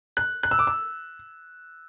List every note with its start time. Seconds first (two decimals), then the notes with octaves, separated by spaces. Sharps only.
0.17 F#6
0.43 F#6
0.51 E6
0.59 D6
0.67 E6